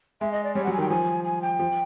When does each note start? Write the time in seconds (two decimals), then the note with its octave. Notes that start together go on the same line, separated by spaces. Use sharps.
0.21 G#3 E5
0.32 D#5
0.44 D5
0.55 G3 C#5
0.64 F#3 F#5
0.72 G#5
0.78 D#3
0.81 G5
0.90 F3 G#5
1.24 G#5
1.42 G5
1.59 F3